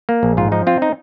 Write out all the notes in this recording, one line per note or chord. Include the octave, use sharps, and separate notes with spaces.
A#3
A#1
G#2 F4
F3 D#4
C4 F4
D#4